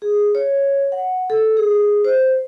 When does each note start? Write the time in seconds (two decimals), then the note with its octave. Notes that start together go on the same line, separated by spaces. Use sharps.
0.02 G#4
0.35 C#5
0.92 F#5
1.30 A4
1.57 G#4
2.05 C5